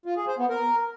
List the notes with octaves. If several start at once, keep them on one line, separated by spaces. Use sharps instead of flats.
F4
G#4
C5
B3
A#4